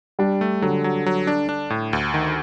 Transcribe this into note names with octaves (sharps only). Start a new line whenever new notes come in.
G3 D4
A3
D3 F#3
F#3
F#3
D4
D4
A2
D2
D#3